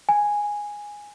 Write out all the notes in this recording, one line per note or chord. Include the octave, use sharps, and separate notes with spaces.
G#5